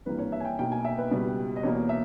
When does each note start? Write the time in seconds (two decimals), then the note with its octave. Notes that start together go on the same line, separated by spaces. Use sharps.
0.05 G#1 G2 E3 A#3 B4
0.19 C#5
0.32 E5
0.40 G#5
0.45 G5
0.58 B1 B2 A#3 G5
0.72 G#5
0.85 E5
0.98 B4
1.11 C#2 B2 G3
1.56 D#5
1.63 E2 B2 A#3 C#5
1.89 E5